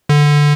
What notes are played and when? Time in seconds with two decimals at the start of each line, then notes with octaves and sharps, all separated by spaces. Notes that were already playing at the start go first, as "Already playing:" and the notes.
0.09 D3